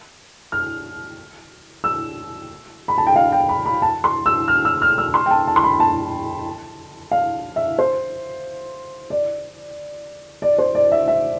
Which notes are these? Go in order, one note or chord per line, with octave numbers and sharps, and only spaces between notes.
F6
E6
B5
A5
G5
F5
G5
B5
B5
A5
C6
E6
F6
E6
F6
E6
C6
G5
A5
A5
C6
B5
A5
F5
E5
C5
D5
D5
C5
D5
E5
E5